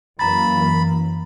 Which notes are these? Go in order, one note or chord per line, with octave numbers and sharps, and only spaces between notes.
F#2 E3 A#3 A#5 B5 A6